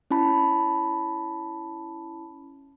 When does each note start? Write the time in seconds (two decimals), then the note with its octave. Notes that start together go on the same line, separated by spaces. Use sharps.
0.11 C#4 E4 A5 B5